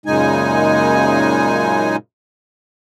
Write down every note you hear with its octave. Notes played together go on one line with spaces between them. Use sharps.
F#2 A#2 C#3 G#3 D#4 G#5